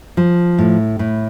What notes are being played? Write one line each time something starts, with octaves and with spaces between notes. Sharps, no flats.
F3
A2
A2